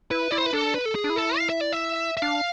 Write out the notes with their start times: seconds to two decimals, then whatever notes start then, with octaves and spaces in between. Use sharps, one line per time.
0.11 E4 B4
0.31 E4 D5
0.38 C5
0.46 B4
0.53 D4 A4
0.74 B4
0.85 A4
0.95 G#4
1.04 D4
1.10 E4
1.16 A4
1.38 F5
1.49 E5
1.61 D5
1.73 E5
2.17 E5
2.22 D4 F5